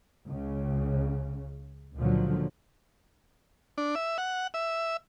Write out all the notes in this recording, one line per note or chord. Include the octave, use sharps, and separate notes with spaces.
C#2 C#3
C#2 A#2 D3 F3 F#3
D4
E5
F#5
E5